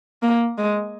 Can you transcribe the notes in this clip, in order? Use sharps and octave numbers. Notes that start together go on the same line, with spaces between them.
A#3
G#3